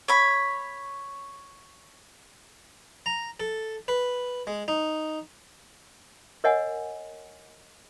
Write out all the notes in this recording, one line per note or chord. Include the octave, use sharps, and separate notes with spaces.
C#5 B5
A#5
A4
B4
G#3
D#4
A#4 C#5 D#5 F#5 G#5